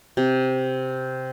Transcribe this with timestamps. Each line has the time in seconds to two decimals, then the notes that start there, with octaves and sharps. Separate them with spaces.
0.17 C3